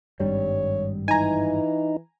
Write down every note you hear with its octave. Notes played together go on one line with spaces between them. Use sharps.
G#1 G2 G3 C#5
E3 D#4 G#5 A#5